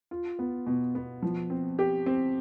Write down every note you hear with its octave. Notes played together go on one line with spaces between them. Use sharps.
F4
B3
B2
B3
F3
C4
G4
C4